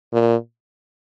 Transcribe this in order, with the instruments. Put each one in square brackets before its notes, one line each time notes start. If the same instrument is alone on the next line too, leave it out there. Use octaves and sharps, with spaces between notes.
[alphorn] A#2